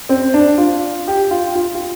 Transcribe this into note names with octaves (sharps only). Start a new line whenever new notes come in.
C4
D4
F4
G4
F4
F4
F4